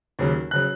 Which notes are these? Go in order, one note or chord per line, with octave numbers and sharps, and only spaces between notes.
D#2 C#3 F#3
C#3 F#3 F#6